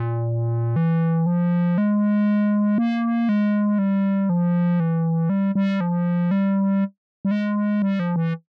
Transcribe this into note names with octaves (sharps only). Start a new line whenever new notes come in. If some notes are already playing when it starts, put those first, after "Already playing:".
Already playing: A#2
E3
F3
G#3
A#3
G#3
G3
F3
E3
G3
G3
F3
G3
G3
G#3
G3
F3
E3